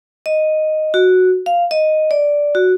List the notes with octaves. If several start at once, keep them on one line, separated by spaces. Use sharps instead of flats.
D#5
F#4
F5
D#5
D5
F#4